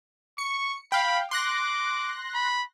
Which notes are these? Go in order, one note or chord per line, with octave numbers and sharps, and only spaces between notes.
C#6 C#7
F5 G5 B5
C6 D6 F#6 A#6
B5